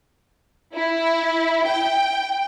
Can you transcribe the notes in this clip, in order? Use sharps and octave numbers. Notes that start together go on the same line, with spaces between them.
E4
G5